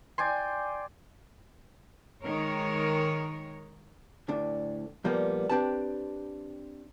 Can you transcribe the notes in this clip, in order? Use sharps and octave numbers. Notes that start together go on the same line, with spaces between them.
D5 G5 G#5 C6
D#3 G#3 A#4 C#5
D2 A2 D4
A#2 F3 G3 A#3 B3
C4 D4 G4 B4 A5